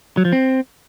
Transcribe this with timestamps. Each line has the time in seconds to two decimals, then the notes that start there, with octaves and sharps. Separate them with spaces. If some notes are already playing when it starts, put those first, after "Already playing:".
0.17 F#3
0.25 F3
0.33 C4